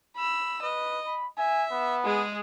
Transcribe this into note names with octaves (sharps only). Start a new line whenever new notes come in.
B5 E6
B4 D#5
B5
E5 G#5
B3
G#3 G#4